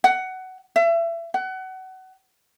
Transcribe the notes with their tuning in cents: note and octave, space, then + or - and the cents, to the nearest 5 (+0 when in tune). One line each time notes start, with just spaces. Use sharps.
F#5 +15
E5 +30
F#5 +25